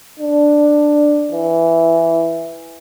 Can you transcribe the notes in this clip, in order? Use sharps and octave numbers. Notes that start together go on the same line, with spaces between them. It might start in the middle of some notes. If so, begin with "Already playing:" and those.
D4
E3